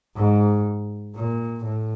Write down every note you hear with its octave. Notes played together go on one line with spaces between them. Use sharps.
G#2
A#2
A2